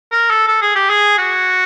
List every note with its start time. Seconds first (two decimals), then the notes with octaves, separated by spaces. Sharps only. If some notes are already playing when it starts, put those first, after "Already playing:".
0.12 A#4
0.30 A4
0.48 A4
0.62 G#4
0.75 G4
0.89 G#4
1.18 F#4